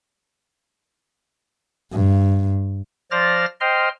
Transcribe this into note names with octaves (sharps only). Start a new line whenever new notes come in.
G2
F3 C5 D5 F6 A6 A#6
C5 D#5 G5 C6 F6